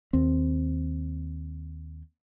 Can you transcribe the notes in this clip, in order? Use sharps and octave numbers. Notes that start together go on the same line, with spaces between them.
D#2 C4